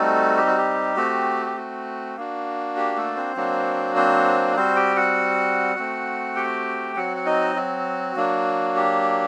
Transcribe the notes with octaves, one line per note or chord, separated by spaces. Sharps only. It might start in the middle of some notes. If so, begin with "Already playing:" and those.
Already playing: G3 A3 C4 D#4 F#4 A4
G4
F#4
G4
A3 C4 F#4
G4
F#4
A#3 D4 F#4
G4
A3 A4
C4 C5
F#3 A#3 D4 F#4
C4 C5
G3 C4 F#4 C5
G4 G5
F#4 F#5
A3 C4 F#4
G4 G5
F#3 C4 F#4 F#5
F#5
D#4 D#5
F#4
F#3 A#3 D4
G4